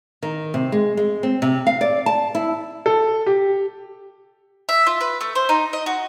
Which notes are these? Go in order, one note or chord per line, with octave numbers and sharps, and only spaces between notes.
D#3
C3
G#3
G#3
C4
C3
F5
D5
A5
E4
A4
G4
E5
F4
B4
A3
C5
D#4
D#5
F#4